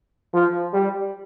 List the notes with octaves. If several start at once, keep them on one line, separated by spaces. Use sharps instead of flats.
F3
G3